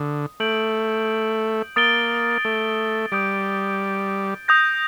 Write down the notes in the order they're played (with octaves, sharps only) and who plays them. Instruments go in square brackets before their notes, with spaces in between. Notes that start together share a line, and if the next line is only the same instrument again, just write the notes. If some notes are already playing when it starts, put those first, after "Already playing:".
Already playing: [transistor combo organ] D3 [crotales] D#6
[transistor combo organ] A3 [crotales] G6 D7 F#7
[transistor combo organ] A#3 [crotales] D#6 A6 D7 G7
[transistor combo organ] A3
[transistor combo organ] G3 [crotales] D#6 G6 D7
[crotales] D#6 G6 A#6